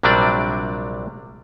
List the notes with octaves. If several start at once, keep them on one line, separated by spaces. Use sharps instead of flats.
A#1 C3 F#3 G3 D4 D5